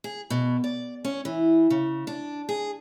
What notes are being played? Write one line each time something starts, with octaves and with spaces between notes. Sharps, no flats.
G#4
B2
D5
C#4
E3
C#3
D4
G#4